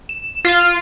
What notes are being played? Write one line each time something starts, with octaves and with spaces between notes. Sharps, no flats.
E7
F4